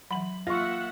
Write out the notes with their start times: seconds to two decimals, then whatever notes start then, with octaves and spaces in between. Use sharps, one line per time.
0.11 E3 F#3 B5 F#7
0.47 A#3 F4 E5 F#5 C#6 A#6